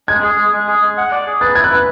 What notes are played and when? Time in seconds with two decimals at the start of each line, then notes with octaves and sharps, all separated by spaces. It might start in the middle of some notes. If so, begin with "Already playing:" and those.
0.08 G#3 G#6
0.23 G#4
0.38 G#3
0.52 G#3
0.67 G#4
0.82 G#3
0.97 F#5
1.12 D5
1.27 G#4
1.41 B4 A6
1.55 E4 G#6
1.64 F#6
1.71 B4